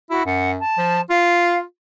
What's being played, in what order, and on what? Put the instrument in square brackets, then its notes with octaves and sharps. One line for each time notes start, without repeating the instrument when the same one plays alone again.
[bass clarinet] E4 [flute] F#4
[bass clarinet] F#2 [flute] F#5
[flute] A5
[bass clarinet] F3
[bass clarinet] F4 [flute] F5